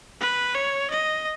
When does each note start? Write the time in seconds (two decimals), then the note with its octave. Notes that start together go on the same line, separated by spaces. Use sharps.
0.21 B4
0.55 C#5
0.90 D#5